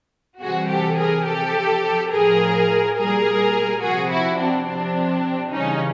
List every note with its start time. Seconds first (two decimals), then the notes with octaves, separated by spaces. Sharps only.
0.41 C3 E3 G3 F#4 G#4
0.70 G4 A4
0.97 G#4 A#4
1.26 C3 F3 G4 A4
2.11 A2 F3 G#4 A#4
2.96 A#2 G3 G#4 A#4
3.81 C3 F3 F#4 G#4
4.09 E4 F#4
4.37 C4 D4
4.66 C3 F3 C4 D4
5.51 C#3 E3 G3 C#4 D#4